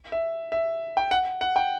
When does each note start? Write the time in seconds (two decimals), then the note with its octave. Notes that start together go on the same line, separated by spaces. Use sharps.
0.12 E5
0.52 E5
0.97 G5
1.11 F#5
1.41 F#5
1.56 G5